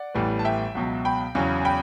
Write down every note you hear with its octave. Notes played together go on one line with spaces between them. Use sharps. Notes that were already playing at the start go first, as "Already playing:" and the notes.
Already playing: D5 F#5
A1 A2 E3 G3 B3
A5
E5 G5
C#2 B2 F#3
G5 B5
E2 C#3 F#3 C#4
G5 B5